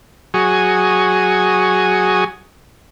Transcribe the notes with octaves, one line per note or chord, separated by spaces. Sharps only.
F#3 F#4 G#4 G#5 C#6 D#6